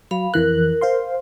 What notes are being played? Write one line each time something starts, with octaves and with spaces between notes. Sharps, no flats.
F#3 F5 B5
F2 E3 A#4 F#6
C5 F5 C6